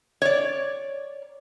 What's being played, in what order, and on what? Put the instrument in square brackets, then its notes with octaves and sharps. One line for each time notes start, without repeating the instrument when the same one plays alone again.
[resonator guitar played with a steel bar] C#5 D5